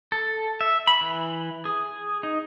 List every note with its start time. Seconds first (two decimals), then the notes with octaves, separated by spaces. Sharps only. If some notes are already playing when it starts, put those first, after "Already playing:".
0.12 A4
0.61 E5
0.87 B5
1.01 E3
1.65 G#4
2.23 D#4